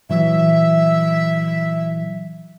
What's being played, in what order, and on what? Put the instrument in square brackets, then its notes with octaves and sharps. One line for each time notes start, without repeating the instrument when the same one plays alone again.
[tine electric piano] A#2 E3 F#3 [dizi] E5